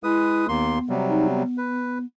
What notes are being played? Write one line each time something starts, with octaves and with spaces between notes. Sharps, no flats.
G#3 E4 B4 D#6
D#2 A#3 B3 C6
C3 F#3 G3
D#4
B3
B4